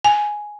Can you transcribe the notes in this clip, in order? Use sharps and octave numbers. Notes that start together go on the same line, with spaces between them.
G#5